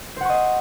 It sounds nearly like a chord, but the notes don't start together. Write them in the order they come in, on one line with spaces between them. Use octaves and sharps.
C5 F#5 C#6 D#5